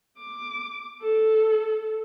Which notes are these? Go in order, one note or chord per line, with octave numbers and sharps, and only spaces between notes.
D6
A4